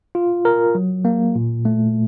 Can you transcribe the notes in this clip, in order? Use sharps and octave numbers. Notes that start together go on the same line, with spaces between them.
F4
A#4
F#3
A#3
A#2
A3